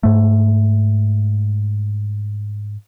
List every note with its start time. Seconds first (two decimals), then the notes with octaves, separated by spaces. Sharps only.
0.03 G#2 A3